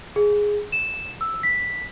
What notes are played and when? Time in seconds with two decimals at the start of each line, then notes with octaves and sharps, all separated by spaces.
0.16 G#4
0.72 E7
1.21 E6
1.43 B6